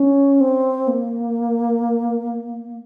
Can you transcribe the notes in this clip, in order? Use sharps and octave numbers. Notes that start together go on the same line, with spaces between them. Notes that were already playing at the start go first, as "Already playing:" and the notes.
Already playing: C#4
C4
A#3